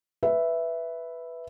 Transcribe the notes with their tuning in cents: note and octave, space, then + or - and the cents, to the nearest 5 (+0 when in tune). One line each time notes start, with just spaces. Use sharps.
B4 +0 E5 +0